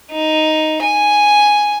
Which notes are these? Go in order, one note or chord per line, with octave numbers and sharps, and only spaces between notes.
D#4
G#5